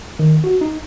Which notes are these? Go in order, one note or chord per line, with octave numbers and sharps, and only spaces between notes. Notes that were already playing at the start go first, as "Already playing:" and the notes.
D#3
F#4
D#4